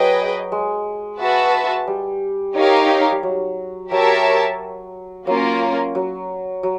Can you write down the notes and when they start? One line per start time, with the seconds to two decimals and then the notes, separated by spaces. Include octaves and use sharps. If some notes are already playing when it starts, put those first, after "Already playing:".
Already playing: F#3 G#4 B4 D#5 G5
0.52 G#3
1.20 F#4 B4 E5 A5
1.87 G3
2.56 D#4 G4 A#4 C#5 F5
3.12 G3
3.23 F#3
3.91 F#3 G4 A#4 C#5 E5 A5
5.27 F#3 A#3 C#4 F4 A#4
5.95 F#3
6.63 F#3